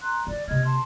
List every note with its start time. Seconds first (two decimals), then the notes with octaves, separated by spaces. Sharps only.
0.01 A#5 C6 F#6
0.27 D#3 D5
0.48 C3 A#3 D#5 F6 G#6
0.65 A5 C6